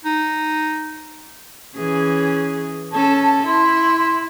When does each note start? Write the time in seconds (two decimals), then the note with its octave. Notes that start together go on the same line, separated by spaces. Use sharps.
0.05 D#4
1.76 E3 C#4 G#4
2.93 C#4 A4 A5
3.47 E4 C6